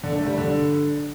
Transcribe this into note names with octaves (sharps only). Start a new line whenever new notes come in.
D3
A3
G3
D3